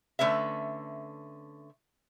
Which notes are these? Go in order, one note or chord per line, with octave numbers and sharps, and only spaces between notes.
D3 A3 C#4 B4 E5